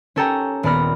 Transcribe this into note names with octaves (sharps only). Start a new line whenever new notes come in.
C#4 G4 A4 C#5 G5 A#5
D#1 B3 D5 B5 F6 A#6